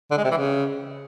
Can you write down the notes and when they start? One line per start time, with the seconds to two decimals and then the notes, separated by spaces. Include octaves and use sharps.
0.11 D3
0.17 G#3
0.24 C3
0.31 E3
0.37 C#3